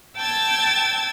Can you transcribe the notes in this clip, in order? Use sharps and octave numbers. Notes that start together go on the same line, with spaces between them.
G5 A5 E6 G#6 A6